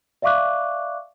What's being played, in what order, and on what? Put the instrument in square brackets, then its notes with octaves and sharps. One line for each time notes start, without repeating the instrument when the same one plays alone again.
[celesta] D5 E5 F5 C#6 D6 F#6